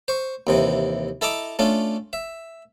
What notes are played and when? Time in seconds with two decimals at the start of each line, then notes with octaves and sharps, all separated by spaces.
0.08 C5 C#6
0.47 D#2 C3 E3
1.21 E4 A4 D#5 A5 A#5 D6
1.59 A3 C#4 D4 F4
2.13 E5